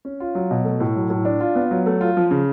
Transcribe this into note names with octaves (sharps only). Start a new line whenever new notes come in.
C#4
F4
F#3
B2
A3
A2
F#3
A2
D4
F4
B3
F#3
A3
F4
F3
C#3